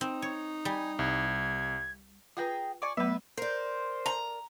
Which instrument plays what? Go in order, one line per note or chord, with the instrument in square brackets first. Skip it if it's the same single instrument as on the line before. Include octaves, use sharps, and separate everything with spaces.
[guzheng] C4 [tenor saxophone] D#4
[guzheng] C#5
[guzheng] G3 [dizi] G#5
[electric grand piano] C2 [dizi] G#6
[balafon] F4 B4 [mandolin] G#4 G5 A#5
[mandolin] D5 G#5 C#6
[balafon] F#3 A3 [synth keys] B3 [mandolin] B4 E5
[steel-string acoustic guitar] A#4 D5 [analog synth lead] C5
[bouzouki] A#5